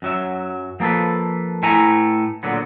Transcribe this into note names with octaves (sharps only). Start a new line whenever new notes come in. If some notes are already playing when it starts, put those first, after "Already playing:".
F#2 F#3 E5
F3 A#3 G4 A4 B4
A2 A3 E4 B4 G#5 A#5
A#2 D3 F#3 B3